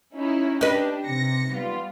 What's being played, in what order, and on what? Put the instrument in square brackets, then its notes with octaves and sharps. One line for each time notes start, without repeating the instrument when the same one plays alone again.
[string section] C#4 D#4 E4
[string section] D4 G4 [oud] D#4 B4
[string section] C3 A#6 C#7
G3 B3 F4